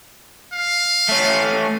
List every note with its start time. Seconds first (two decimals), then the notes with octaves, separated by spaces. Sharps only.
0.53 F5
1.09 A3 C#4